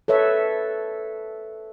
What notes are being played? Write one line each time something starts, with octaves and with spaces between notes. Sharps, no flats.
A4 B4 C#5 E5